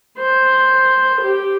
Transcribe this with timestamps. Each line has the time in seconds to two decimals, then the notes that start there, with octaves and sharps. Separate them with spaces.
0.19 C5
1.21 G4